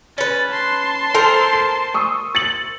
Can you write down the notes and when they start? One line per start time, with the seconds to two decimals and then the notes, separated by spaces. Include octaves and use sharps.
0.18 C#4 B4 A6
0.51 A5 C6
1.14 A4 A#4 C5
1.53 C7
1.94 C#6 D#6 E6
2.35 A6 C#7 F#7